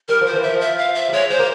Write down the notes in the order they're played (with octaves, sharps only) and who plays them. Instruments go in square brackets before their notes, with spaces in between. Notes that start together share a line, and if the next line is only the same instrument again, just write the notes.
[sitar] G3 [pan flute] A#4
[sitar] F3
[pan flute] C5
[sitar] E3
[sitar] F3 [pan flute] E5
[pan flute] E5
F5
E5
[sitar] G3
[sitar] G#3 [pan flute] C#5
[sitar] G#3 [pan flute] C5
[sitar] A#3